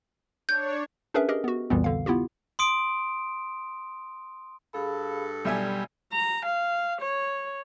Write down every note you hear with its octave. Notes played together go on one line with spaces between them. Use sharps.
D4 C#5 G6
C#4 D4 G#4 A#4 B4 E5
G4 G#4 A#4 D#5
B3 F#4
C2 F2 A#2 E3 G3 B3
D3 F5
B3 E4 F4 G4
C6 D#6 D7
G2 G#4 A4 F5 B5
B1 G3 D5 E5 G#5
A#5
F5
C#5